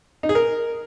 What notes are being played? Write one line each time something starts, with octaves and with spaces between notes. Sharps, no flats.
D#4
G#4
A#4